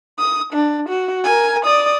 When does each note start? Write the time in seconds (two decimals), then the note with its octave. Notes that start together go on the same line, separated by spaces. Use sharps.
0.19 D#6
0.53 D4
0.89 F#4
1.25 A#4 G#5
1.65 D5 D#6